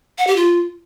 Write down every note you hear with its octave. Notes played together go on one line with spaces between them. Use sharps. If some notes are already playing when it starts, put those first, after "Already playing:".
F#5
G4
F4